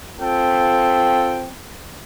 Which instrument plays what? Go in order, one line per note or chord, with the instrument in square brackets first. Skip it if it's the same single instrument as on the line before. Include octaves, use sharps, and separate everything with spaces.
[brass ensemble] C4 F4 A4 G5